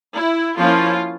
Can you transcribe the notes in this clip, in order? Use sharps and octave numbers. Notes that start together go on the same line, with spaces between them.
E4
F3 A#3 C#4 E4 F4